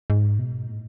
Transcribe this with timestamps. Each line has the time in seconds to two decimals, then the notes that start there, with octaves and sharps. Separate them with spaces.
0.10 G#2
0.39 B2
0.68 A2